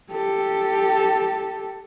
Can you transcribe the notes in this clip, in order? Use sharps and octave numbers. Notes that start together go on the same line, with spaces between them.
G4 A4